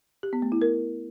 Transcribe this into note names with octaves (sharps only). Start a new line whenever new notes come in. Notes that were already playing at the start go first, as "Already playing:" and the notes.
G4
B3
A3
E4
A#4